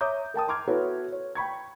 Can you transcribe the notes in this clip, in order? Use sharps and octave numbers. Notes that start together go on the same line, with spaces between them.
C#5 E5 A#5 D6 D#6 G6
A#4 G5 A5 D#6
A#5 C6 D6 F6 G#6
B3 E4 F#4 A4 B4 C#5
C#5
G5 B5 C#6 G#6